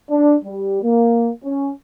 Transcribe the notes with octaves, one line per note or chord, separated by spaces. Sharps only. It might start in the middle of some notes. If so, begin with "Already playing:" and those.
D4
G3
A#3
C#4